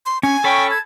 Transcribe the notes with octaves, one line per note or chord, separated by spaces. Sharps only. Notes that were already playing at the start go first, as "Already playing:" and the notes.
C6
C#4 G#5
C#4 A4 G5 B5 C#6
A5 G#6